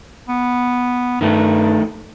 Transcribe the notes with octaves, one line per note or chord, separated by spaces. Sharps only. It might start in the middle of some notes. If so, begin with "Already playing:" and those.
B3
G2 D#3 A3